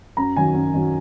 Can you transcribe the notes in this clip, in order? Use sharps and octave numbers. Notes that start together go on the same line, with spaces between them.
F#2 A#5
D#3 F#3 G#5
F#2
D#3 F#3